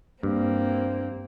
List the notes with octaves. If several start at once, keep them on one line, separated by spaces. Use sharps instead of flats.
G2 A#3 C4